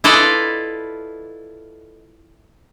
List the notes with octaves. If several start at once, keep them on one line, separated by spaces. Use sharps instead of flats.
E4 F4 A4 B4 D5 D#5